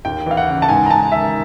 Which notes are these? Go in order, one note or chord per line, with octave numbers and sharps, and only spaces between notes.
D#2 G5
E3 F5
F#5
C#3
A5
G#2 G#5
A#5
G#2 A5
D#3 E5